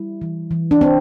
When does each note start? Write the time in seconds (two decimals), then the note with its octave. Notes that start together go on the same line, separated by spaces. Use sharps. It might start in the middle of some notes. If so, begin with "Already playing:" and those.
Already playing: G3 E4
0.22 E3
0.51 E3
0.71 D4
0.81 C3 C4